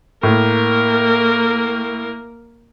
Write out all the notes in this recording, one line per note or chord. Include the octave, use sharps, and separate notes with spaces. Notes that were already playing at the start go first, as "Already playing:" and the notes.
A2 A#3 A#4